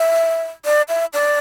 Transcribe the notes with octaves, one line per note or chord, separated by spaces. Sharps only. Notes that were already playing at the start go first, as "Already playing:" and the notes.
Already playing: E5
D5
E5
D5